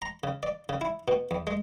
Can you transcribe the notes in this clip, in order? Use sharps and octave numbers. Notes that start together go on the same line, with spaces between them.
A#5
C#3
D5
C#3
E4
B2
E2
G#3